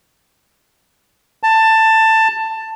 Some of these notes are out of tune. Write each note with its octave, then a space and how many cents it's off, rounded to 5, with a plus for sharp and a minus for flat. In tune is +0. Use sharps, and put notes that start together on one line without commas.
A5 +15